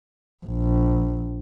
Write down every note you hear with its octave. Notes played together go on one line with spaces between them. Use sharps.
A#1